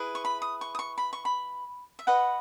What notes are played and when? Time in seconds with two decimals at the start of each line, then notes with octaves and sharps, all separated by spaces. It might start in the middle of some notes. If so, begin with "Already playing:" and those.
Already playing: E4 G#4 B4
0.15 C#6
0.25 B5
0.42 D#6
0.61 C#6
0.75 D#6
0.79 C#6
0.98 B5
1.13 C#6
1.25 B5
1.99 E5
2.07 F#4 B4 D#5 F#5